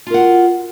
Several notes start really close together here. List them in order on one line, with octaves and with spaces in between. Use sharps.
F4 A#4 F#5 F#4